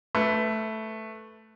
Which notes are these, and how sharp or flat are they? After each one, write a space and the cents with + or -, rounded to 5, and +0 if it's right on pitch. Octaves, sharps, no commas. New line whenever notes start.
A3 +0 B4 +0